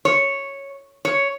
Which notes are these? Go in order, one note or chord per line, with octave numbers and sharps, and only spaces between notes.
C#5
C#5